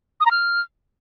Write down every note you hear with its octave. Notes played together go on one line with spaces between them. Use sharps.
D#6
A#5
F6